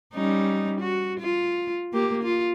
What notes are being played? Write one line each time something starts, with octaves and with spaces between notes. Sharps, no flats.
G3 C#4 D#4
F#4
F4
A#3 G4
F4